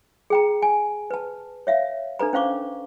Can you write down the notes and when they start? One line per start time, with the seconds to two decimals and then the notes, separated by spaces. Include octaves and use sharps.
0.30 G#4 G5 A#5
0.62 G#5
1.11 B4 A5
1.67 C#5 E5 F5
2.19 D4 A4 B4 A#5
2.33 C#4 C5 F5 C#6 D6